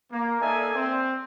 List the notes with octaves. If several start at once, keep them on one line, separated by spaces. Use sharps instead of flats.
A#3
A#3 D#4 A4 D5 E5 G#5
C4